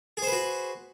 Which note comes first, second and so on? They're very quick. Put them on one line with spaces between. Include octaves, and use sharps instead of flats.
G#4 C5 B4 F#4